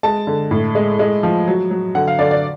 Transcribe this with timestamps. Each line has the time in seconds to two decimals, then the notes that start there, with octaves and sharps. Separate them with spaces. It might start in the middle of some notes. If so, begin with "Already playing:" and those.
0.03 G#3 A5
0.27 D3
0.51 A2
0.75 G#3
0.99 G#3
1.23 F3
1.47 F#3
1.71 F#3
1.95 D3 F#5
2.07 F5
2.19 D3 D5
2.31 D5